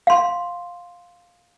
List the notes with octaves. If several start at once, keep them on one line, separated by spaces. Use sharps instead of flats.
F5 C6